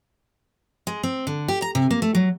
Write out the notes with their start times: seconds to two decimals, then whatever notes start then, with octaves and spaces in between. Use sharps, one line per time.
0.87 G#3
1.03 C4
1.27 D3
1.48 G4
1.62 A#5
1.75 C3
1.91 A#3
2.02 A3
2.15 F#3